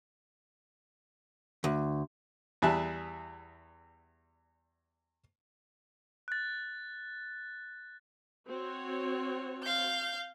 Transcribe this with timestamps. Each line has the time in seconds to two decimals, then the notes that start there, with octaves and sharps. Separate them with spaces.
1.64 D2
2.62 E2 G3 G#4 E5 A5 F#6
6.28 F#6 A6
8.48 C4 F#4 C#5
9.64 F5 G6